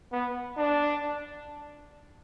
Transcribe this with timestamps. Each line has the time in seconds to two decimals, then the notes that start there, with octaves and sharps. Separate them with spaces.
0.12 B3
0.57 D4